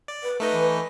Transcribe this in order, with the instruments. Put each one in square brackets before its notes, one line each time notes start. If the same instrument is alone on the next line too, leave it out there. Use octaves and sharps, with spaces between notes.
[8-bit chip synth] D5
[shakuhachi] B4
[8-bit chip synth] A3 D#4 D#5 [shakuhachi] B4
[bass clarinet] E3